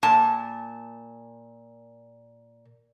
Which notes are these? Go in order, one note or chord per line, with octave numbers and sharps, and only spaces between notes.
A#2 A5